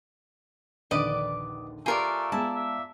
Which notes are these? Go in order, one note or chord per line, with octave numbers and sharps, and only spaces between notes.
A#1 D#2 D3 B4 D5 D#5 D6
A3 F4 G4 A#4 D5 G#5
G#3 B3 E4 G#4 A5
E5